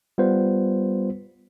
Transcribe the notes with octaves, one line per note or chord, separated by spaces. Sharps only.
G3 B3 F4 B4 C5